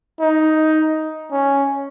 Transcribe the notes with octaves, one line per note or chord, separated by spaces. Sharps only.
D#4
C#4